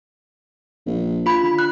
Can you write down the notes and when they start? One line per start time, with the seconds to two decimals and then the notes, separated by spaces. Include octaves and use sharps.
0.86 A#1
1.26 F4 B5
1.42 D3
1.59 F#6